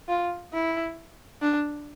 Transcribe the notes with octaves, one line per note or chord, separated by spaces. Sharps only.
F4
E4
D4